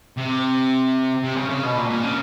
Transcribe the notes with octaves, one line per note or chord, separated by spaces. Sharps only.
C3
C3
C#3
C#3
B2
A#2
A#2
C#3